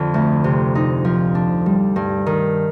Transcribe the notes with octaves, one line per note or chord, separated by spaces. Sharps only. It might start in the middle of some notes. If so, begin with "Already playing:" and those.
Already playing: F2 D3
D2
C3
D#4
F3
D4
G3
G2
D#3